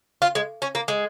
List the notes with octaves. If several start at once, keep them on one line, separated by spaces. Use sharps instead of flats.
F4
G#3
C#4
A#3
G#3